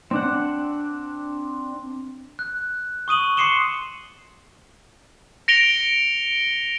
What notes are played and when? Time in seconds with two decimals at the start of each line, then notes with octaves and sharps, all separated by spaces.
0.11 C4 D4 F#5
2.39 F#6
3.08 C#6 D#6 D#7 F#7
3.37 C6 D6 C7 C#7 E7 G7
5.48 A#6 C#7 D7 F7 G7